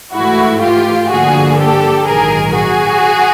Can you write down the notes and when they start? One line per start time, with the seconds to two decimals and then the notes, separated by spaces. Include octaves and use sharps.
0.14 G#2 E3 A3 E4 F#4
0.62 F4 G4
1.11 G2 D3 F3 A#3 F#4 G#4
1.59 G4 A4
2.07 A#1 G#2 D#3 F#3 G#4 A#4
2.55 F#4 G#4